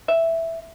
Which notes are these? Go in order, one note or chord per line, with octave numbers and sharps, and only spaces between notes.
E5